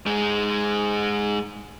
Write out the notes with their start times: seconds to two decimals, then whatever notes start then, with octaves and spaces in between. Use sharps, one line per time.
0.06 G#2 G#3